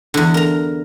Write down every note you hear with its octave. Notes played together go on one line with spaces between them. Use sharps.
E2 D3
A#4 A#5